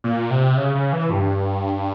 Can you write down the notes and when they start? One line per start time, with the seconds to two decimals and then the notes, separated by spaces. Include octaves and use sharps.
0.04 A#2
0.30 C3
0.57 C#3
0.75 C#3
0.93 E3
1.10 G2